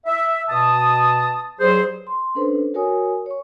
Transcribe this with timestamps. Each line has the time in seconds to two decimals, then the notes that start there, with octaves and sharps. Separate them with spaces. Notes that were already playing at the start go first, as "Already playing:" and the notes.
0.06 E5
0.49 B2 A5 D#6
1.60 G2 F#3 G#4 C5
2.07 C6
2.35 C#4 D4 A4 B4 C5
2.74 F#4 A#4 C#5 G#5 D#6
3.26 C#5 C#6